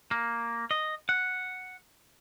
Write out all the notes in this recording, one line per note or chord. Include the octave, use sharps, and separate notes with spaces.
A#3
D#5
F#5